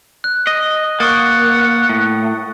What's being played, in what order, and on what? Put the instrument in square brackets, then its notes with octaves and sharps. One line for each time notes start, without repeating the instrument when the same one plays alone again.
[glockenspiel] F#6
[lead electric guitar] D#5
[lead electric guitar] A#3 [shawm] F#5 [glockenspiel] C#6 D#6 A6
[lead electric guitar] A2